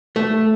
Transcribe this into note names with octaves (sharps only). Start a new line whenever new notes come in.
A3